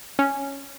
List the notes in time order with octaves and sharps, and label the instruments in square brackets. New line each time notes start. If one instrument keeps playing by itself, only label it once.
[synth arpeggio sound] C#4